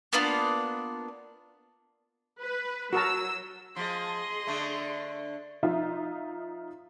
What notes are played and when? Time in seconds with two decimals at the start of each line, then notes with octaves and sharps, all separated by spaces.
0.13 A#3 B3 D4 F4
2.41 B4
2.93 F#3 F#4 A#4 A5 E6
3.76 F3 G#4 D#5 C6
4.47 D3 A3
5.63 F3 D#4 F4 E5